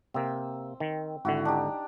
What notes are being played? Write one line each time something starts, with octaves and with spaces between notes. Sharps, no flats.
C3 A#3 C4 E6
D#3
G#1 D3 E4 F#4
D4 D#4 G4